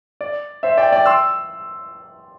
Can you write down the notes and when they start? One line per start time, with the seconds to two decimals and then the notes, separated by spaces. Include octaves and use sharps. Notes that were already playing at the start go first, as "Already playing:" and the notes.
0.21 D5
0.63 C5 E5
0.77 D5 G5
0.92 D5 G5
1.06 C6 E6